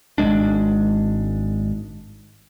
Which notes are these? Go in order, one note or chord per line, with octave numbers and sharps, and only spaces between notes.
G#1 F2 G#3 D4